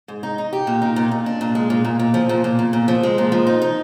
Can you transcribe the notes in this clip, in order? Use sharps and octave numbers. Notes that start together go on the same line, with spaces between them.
G#2
D#4
D#4
G4
A#2
D#4
A#2
A#2
D4
A#2
G#3
A#2
A#2
A#2
F3
A#2
A#2
A#2
A#2
F3
G#3
A#2
F3
D#4
D#4